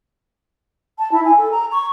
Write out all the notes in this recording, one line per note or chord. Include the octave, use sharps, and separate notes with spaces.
A5
E4
G#5
A4
A#5
C#6